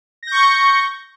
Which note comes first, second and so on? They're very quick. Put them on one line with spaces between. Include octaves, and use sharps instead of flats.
A#6 G6 C#6